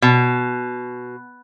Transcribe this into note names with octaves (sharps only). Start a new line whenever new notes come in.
B2